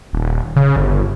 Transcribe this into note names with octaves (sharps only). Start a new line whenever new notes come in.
D#1
C#3
G1